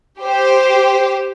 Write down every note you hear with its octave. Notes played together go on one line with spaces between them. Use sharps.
G4 C5